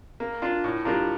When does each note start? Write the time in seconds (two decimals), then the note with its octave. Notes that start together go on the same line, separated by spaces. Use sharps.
0.20 A#3
0.42 D4 F4
0.64 A2
0.85 G3 D4 F4 A#4